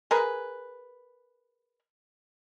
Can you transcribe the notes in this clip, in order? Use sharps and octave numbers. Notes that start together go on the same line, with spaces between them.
G#4 A#4 B4